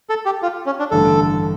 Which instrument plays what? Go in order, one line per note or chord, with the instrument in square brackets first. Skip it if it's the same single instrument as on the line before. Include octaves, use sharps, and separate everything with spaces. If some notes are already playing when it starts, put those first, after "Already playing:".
[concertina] A4
G4
F4
C#4
D4
[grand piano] A1 G2 D3 A3 [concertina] A4